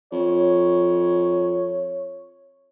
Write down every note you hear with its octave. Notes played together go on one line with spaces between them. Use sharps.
F2 C#5